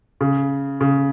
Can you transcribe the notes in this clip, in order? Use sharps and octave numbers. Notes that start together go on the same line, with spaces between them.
C#3
C#3